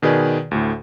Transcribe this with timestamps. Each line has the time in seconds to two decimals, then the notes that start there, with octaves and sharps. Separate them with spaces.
0.02 B2 D#3 G#4 B4 D5 G#5
0.51 D2 A2